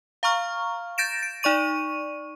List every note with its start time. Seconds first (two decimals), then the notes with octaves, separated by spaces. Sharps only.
0.23 F5 A#5 C#6 F6
0.98 G6 A6 A#6 D7 E7
1.23 D7
1.43 D#4 D5 C#6 D#7